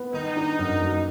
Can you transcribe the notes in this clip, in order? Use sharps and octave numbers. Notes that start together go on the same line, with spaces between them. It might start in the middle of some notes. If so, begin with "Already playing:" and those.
Already playing: B3
D#3 D#4
D4
F#2
F#3